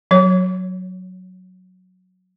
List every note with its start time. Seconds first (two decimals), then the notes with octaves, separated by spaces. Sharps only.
0.11 F#3 C#5